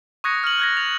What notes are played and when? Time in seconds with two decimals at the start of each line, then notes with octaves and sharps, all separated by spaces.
0.24 C#6 D#6 F#6 G#6 A#6 C#7
0.44 F6 F#7
0.60 F#6 G#6 A#6
0.77 A6 F7